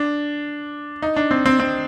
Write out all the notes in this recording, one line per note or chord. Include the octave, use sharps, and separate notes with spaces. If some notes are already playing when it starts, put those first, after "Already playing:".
Already playing: D4
D#4
D4
C4
C4
C4